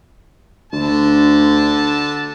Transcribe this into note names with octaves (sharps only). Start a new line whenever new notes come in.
D2 D3 A5